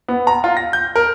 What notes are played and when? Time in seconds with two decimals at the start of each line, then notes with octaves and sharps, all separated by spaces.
0.08 B3
0.27 A#5
0.44 F4
0.57 A#6
0.73 G6
0.96 A#4